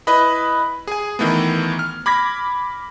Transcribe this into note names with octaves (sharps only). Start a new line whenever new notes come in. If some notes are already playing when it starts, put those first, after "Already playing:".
E4 B4 D#5 B5
G#4 G#5
D#3 E3 A3 B3
F6
B5 D6 G#6 A#6 B6